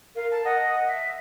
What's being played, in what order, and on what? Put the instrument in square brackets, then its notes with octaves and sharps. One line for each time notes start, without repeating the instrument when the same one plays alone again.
[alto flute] A#4 [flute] F5
[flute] A5
[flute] D#5 [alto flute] F#5
[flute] E5